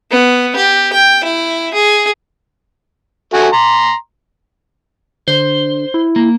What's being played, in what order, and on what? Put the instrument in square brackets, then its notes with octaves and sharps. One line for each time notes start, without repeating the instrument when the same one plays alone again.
[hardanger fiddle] B3
G4
G5
E4
G#4
[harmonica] A3 F#4 G#5
A#5 C6
[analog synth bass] D3 [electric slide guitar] C5
[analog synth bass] E4
[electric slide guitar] A#3